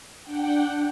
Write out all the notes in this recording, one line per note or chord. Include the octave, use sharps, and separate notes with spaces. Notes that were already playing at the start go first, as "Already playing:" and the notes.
D4 F#5 G5